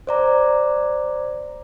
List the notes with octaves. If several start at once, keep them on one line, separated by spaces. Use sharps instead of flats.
C5 D5 A#5